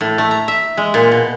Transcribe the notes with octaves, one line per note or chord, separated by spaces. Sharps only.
A2
A3
A#5
E5
G#3
A#2
B2